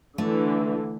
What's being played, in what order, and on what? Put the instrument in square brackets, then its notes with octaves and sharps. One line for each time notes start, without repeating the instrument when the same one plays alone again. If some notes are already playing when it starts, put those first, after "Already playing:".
[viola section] D3 E3 [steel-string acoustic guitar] A3